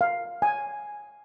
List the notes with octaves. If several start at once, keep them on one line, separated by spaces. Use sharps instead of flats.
F5
G#5